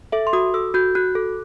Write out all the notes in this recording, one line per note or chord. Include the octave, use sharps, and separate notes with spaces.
A4 E5
C6
F#4 D#6
A4 E6
F#4 G6
F#4 F#6
A4